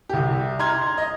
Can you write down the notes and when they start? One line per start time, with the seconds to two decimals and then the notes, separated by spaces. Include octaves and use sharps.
0.09 C2 G4
0.59 A#5 C6 F6 G#6
0.98 D#5